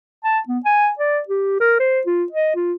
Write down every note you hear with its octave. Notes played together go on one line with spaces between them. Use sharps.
A5
B3
G#5
D5
G4
A#4
C5
F4
D#5
F4